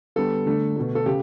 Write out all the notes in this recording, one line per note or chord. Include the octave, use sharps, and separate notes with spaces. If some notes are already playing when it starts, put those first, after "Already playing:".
D3 G3 B3 A4
D3 A3
B2 A3
A4
C#3 G4